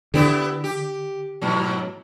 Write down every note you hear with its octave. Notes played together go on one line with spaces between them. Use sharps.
D3 B3 E4 G4
G4
G#2 B2 F#3